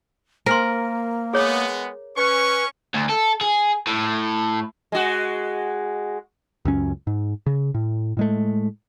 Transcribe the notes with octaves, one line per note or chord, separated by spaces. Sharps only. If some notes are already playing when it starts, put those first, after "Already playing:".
A#3 A#4 C5 G#5 C6
G#3 B3 G#4 C#5
C#4 B4 C#6
D2
A4
G#4
A2
G#3 F#4
C#2 F#2 C#4
G#2
C#3
A2
A2 G#3 A3